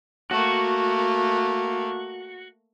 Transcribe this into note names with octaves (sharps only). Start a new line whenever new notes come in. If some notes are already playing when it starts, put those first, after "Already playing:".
A3 A#3 F#4